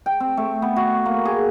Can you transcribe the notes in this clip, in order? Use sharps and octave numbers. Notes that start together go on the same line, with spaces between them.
G5
C4
A3
B3
F#4
A#3
G#4